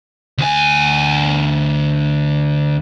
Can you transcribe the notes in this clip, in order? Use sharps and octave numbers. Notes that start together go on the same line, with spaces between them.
D2 G#5